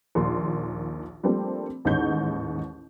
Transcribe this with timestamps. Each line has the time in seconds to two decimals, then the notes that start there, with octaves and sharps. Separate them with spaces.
0.15 A#1 D#2 A#3 C6
1.23 F3 G3 A3 A#3 C4 D4
1.85 A1 D#2 G#2 D#4 C#5 G6